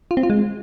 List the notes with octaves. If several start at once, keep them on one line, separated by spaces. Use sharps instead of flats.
F4
C4
F4
G#3